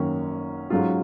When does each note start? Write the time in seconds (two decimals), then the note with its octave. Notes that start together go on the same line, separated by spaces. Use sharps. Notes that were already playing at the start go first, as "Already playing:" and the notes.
Already playing: G#1 F#2 D#3 A#3 C#4
0.70 G#2 F#3 C#4 F4